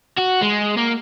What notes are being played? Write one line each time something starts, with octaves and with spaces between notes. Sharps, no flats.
F#4
G#3
A#3